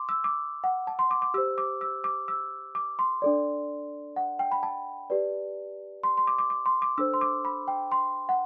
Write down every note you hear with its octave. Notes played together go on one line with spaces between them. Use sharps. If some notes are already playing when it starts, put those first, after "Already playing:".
Already playing: C6 D6
E6
D6
F#5
A5
C6
D6
D6
G4 C5 E6
D6
E6
D6
E6
D6
C6
D4 A4 D5
F#5
G5
B5
A5
G4 B4 D5
C6
C6
D6
D6
D6
C6
D6
D4 A4 C5 E6
C6
D6
B5
G5
C6
F#5